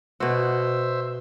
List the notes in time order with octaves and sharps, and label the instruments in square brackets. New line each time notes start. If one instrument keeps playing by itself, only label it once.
[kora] B2 F#4 [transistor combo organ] C5 E5